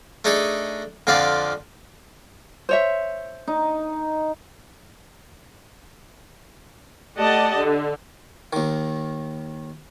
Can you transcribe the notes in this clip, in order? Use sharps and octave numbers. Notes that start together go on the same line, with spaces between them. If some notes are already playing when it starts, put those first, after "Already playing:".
A3 D4 D#4 G#4 A4
F2 D3 C4 F4 D5
C5 C#5 E5
D#4
A3 G4 D5 D#5 F#5 A5
D3
D#2 D#3